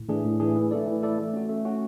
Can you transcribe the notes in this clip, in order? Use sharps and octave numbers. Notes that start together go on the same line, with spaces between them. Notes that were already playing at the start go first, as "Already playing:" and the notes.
Already playing: A2
E3 A3 D4 G#4
A2
E3 A3 D4 G#4
E3
A3 E4 A4 D5
E3
A3 E4 A4 D5
A3
C#4 F#4
A3
C#4 F#4